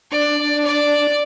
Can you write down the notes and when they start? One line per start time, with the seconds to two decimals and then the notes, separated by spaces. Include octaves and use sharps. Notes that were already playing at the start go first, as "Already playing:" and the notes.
0.12 D4 D5
0.65 D5